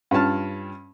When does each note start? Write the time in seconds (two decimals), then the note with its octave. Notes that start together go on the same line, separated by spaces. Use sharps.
0.11 G2 C#4 F4 A5 F6